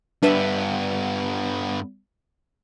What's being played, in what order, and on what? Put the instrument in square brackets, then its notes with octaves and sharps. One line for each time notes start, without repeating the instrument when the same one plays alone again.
[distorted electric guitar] G2 B3 [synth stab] D4 B4 E5